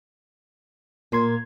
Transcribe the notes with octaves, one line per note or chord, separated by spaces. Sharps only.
A#2 A#3 C6 G#6